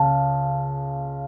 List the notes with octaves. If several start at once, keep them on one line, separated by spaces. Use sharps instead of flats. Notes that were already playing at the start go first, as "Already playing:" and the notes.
Already playing: C#2 C#3 A5